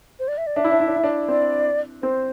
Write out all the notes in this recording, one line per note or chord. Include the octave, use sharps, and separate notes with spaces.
C5
D5
E5
D5
D4 E5
E4
D4
E4
D4
E4
D4
C4 D5
C4 C5